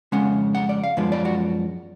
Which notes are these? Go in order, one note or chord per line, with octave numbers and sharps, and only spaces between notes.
F2 C#3 G#3 C#4 F#5
F#5
D5
F5
F#2 F3 G#3 B3 D4
D5
F#4